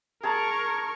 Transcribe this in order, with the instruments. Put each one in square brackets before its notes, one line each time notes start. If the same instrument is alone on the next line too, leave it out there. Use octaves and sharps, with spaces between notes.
[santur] G#4 A5 A#5 [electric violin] A#4 C#6